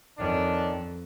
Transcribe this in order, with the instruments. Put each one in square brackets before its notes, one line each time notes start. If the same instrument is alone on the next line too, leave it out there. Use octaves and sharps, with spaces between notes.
[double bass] F2 [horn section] D#3 C#4 D4